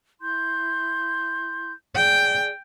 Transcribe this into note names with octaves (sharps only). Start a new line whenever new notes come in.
E4 C6 G6
G#4 D5 G5